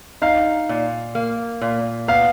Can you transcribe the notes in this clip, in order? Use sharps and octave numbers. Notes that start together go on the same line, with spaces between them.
D#4 F5
A#2
A#3
A#2
B3 F5